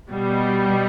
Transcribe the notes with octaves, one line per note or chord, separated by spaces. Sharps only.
B2 G3